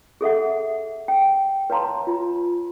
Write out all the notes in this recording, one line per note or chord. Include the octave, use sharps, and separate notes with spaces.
G#4 A4 E5 F#5
G5
B4 C#5 F5 A5 A#5 C6
F4